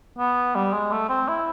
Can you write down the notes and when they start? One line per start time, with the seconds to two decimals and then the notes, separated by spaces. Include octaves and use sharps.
0.18 B3
0.55 G3
0.73 G#3
0.92 A3
1.09 C4
1.28 E4